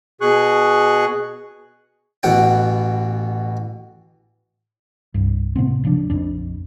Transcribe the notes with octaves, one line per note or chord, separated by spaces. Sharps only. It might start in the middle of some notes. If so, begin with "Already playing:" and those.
B2 G#4 C#6 F#6
A1 B2 F#5 G5
C2 G2
A2 C3 B3 C4
D1 C#3 F3 D4
A#1 F2 D4